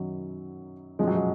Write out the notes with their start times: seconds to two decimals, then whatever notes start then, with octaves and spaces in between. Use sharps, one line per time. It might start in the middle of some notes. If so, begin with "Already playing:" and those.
Already playing: F#2 D#3 F#3
0.99 F#2 F3 G#3
1.07 F#3
1.15 G#3